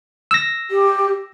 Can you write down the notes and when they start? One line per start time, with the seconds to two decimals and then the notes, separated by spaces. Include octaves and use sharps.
0.31 E6 A#6
0.71 G4